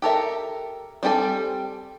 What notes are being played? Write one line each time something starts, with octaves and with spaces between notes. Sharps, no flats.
G4 A4 A#4 E5
G3 C4 G4 A4 G#5